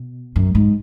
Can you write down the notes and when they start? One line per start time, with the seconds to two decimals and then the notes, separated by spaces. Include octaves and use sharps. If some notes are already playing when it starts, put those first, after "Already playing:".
Already playing: B2
0.36 F#2
0.55 G#2